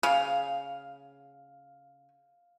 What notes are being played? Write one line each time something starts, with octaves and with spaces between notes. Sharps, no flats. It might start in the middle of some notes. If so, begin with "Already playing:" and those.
C#3 F5